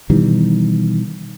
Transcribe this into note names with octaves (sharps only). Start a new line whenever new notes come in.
B2 D#3 E3 G3